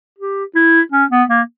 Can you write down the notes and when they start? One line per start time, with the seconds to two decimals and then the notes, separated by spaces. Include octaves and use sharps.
0.18 G4
0.55 E4
0.92 C#4
1.11 B3
1.29 A#3